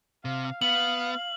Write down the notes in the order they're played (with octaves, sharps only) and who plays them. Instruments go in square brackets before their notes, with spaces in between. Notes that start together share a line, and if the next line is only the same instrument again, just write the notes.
[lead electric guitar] C3 [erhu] F5
[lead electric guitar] B3 [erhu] F5 [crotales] F#7